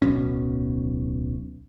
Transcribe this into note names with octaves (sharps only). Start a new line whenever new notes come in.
D1 B1 B2 C#4